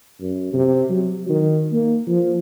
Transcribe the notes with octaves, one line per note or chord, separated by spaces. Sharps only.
F#2
C3
F#3
D#3
A#3
F3